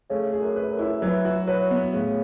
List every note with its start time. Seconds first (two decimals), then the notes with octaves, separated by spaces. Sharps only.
0.10 C#3 A3
0.33 G#4
0.41 F#2
0.56 B4
0.71 F#2
0.79 E4
1.02 E3 F#3
1.25 F#4
1.47 F#3 B4
1.71 B3
1.93 A2 C#3